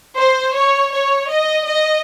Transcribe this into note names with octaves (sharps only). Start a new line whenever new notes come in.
C5
C#5
C#5
D#5
D#5